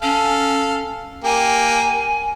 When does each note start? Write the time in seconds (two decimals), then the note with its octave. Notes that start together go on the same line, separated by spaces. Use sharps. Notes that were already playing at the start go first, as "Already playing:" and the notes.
0.02 C#4 A4 F5
1.24 A#3 G4 G#5